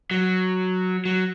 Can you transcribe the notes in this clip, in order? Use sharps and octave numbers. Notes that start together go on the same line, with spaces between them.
F#3
F#3